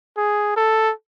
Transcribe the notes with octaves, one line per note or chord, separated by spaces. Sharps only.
G#4
A4